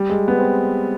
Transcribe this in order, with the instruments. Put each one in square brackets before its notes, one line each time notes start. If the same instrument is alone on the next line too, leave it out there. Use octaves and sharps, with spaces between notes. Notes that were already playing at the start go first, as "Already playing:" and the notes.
Already playing: [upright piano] G3
G#3
B3
C4